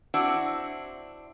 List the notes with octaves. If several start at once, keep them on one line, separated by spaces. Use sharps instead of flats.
C4 D4 E4 F#4